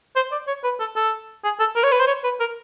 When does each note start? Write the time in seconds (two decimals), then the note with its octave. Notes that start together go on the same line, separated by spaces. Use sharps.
0.16 C5
0.32 D5
0.48 C#5
0.64 B4
0.80 A4
0.96 A4
1.44 G#4
1.60 A4
1.76 A#4
1.83 C#5
1.92 B4
2.00 C5
2.07 C#5
2.24 B4
2.40 A#4